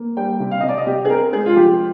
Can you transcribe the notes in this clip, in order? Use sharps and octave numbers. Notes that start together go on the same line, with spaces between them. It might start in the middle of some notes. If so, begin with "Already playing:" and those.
Already playing: A#3
G3 G5
C3
F5
C3 D#5
D5
D#5
C3 G4
G#4
C4 A#4
G#3 G#4
F4
F3 G4